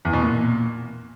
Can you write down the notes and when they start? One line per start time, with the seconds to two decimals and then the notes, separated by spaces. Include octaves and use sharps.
0.05 E2
0.13 B2
0.22 A#2